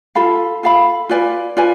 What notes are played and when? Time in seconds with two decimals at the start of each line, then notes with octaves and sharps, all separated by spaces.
0.15 F4 A4 F5 B5
0.63 F4 A4 F5 B5
1.09 F4 B4 D5 G#5
1.57 F4 B4 D5 G#5